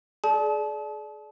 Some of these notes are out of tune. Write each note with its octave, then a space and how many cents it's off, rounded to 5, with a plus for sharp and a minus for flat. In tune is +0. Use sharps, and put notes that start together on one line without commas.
G#4 +35 D5 +0 A5 -35